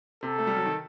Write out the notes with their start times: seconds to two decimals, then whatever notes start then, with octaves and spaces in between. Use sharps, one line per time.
0.23 C3 A4
0.38 A3
0.47 G3
0.56 F#3
0.65 D#3